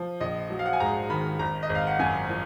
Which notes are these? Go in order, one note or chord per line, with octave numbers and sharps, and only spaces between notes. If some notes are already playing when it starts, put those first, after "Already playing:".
Already playing: F3
A#1 D#5
F#3
F5
F#5
G#5
G#2 A#5
D#3 B5
G#1 A#5
D#5
G#1
F5
F#5
F#2 G#5
F3